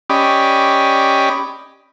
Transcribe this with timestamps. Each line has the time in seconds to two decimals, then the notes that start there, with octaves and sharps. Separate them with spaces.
0.10 C#4 G4 D5 D#5 B5